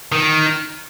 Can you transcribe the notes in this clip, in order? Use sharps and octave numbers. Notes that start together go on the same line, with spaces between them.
D#3